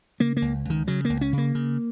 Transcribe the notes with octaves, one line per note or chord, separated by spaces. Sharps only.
C#3 A#3
A#3
C#2
C#2 D#3
C#3 F#3
C#2 A#3
C#4
C#3
A#3
C#3